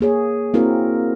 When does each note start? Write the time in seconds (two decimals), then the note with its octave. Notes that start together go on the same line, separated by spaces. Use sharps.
0.01 A#3 G#4 C#5
0.54 A#3 C4 E4 F#4 A#4